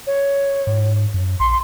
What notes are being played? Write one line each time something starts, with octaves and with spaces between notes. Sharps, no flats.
C#5
G#2
F#2
A#1 C6